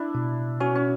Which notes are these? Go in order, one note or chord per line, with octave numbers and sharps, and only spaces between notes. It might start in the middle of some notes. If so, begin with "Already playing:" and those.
Already playing: D4 E4
B2
C#4 F#4
C#4